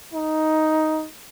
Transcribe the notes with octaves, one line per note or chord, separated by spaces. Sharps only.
D#4